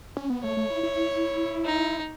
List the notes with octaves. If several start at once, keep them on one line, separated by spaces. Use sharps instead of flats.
C#4
B3
A3 C#5
A3
E4
E4
D#4